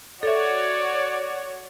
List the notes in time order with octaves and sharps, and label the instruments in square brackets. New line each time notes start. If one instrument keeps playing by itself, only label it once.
[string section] F#4 C#5 [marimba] A4 E5 [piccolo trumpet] D5